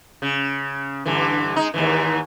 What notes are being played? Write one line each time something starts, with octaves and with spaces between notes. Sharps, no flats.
C#3
G2 D3 E3
G#3 D#4
D#2 G#2 E3